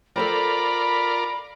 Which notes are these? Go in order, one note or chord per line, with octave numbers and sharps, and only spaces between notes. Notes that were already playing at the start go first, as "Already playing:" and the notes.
F4 A4 A#4 C5 D5 G5 B5